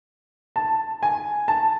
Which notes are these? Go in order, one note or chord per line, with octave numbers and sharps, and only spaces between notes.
A5
G#5
A5